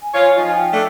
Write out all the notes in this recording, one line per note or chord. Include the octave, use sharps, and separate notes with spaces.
G#5
F4 C#5
F3 D#4 F4
G5
A3 D4